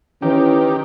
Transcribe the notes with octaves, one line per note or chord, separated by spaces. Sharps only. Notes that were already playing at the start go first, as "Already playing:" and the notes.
D#3 E3 C#4 G4